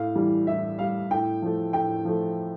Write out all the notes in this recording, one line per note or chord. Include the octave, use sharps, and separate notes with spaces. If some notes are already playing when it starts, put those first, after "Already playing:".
Already playing: A2 F5
E3 G3
A2 E5
E3 G3 F5
A2 G5
F3 A3
A2 G5
F3 A3